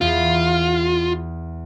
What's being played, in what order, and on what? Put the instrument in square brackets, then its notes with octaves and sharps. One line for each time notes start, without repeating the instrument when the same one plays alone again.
[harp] E2 E3 [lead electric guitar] F4